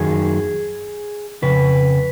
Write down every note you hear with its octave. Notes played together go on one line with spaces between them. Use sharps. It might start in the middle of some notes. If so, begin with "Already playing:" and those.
Already playing: F#2 D#3 F#3 G#4
F2 C#3 B4